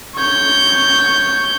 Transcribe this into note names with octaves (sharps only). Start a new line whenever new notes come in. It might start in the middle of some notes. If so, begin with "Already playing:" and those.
C#5 G6